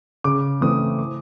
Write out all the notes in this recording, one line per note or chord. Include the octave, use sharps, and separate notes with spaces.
C#3 D6
E3 A3 C4 D#6
D6